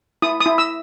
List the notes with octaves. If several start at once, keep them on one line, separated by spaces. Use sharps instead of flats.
E4 D#6
D#6
E4
E6